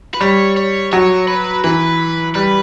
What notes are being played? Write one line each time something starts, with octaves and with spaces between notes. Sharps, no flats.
B4
G3 C#5
C#5
F#3 C#5
B4
E3 B4
G3 B4